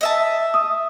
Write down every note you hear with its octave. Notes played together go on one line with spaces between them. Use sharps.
D#5 E5 A5
D#6